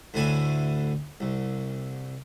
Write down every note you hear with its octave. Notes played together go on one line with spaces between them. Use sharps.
D2 A2 D3 E4 G#5
C2